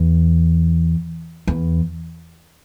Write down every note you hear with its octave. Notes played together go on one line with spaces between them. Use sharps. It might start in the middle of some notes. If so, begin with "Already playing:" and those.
Already playing: E2
E2